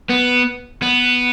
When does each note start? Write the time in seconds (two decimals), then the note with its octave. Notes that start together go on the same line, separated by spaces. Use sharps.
0.09 B3
0.82 B3